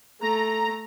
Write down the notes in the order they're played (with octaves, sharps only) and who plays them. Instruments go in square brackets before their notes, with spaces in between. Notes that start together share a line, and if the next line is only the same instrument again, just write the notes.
[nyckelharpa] A3 [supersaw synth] A#5